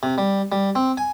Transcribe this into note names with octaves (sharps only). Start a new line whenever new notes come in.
C3
G3
G3
C4
G#5